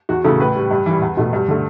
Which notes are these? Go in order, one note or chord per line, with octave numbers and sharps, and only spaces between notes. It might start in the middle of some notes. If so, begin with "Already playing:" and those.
E2 F#4
C#3 E3 A3 A4
A2 B4
G3
G2
E3 G3
E2
B2 A3
G2
D3 A3